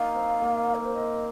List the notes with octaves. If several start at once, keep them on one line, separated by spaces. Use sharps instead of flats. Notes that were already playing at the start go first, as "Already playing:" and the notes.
Already playing: A#3 D#4 F5
C4
A#3
A#4
C5
C4 D#5